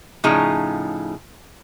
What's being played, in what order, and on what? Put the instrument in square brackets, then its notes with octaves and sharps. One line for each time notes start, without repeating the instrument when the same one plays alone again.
[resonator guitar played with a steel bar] A2 C#3 F3 D#4 G#4 A#5